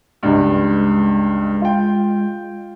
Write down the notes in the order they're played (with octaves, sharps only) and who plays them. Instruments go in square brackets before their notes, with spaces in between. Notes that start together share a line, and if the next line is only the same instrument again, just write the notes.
[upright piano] C#2 G2 [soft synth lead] G#3
[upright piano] F4 G5